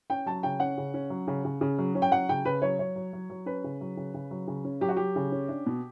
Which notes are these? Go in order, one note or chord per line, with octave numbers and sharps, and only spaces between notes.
C#4 G5
F#3 A5
C#3 G5
C#4 F#5
C#3
C#4
F#3
C#3
C#3
C#3
F#3
C#4
G5
F#3 F#5
C#3 G5
C#3 B4
F#3 C#5
F#3 C#5
F#3
F#3
F#3
C#4 B4
C#3
F#3
C#3
C#3
F#3
C#3
C#4
F#3 G4
F#4
F#3 G4
C#3
C#4
D4
B2